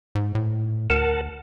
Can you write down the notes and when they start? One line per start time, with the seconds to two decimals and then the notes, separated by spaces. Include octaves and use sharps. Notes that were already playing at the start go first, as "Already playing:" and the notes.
0.15 G#2
0.35 A2
0.90 D2 A#4 F#5 A5